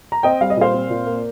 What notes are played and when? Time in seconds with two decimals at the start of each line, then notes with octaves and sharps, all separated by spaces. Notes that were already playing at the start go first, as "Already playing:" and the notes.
0.12 A#5
0.23 C4 D#5 G5
0.41 G3 F5
0.50 D#5
0.57 A#2 C5 F5
0.74 C4
0.90 A#2
1.07 A#3